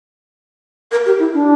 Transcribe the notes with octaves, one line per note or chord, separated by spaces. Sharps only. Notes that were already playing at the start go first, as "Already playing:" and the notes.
A#4
G4
E4
D4